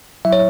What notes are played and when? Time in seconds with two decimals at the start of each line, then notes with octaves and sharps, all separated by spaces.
0.25 F#3 E4 E5
0.33 C#5